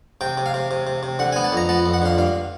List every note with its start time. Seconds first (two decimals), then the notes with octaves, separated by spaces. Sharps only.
0.21 C3 G5
0.38 C3
0.46 F5
0.54 C3
0.71 C3
0.87 C3
1.03 C3
1.19 D3 F#5
1.32 G#5
1.36 B3
1.44 A5
1.52 F2 A#5
1.69 B3 A5
1.86 F2
1.94 F#5
2.02 D3 F5
2.18 G2 F5